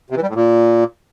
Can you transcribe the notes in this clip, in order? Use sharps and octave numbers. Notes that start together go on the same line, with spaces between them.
C3
E3
G3
A2
A#2